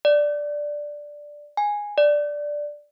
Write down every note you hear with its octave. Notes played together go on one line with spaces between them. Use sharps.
D5
G#5
D5